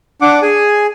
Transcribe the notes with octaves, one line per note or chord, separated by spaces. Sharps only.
D4 F#5 D6
G#4 G#5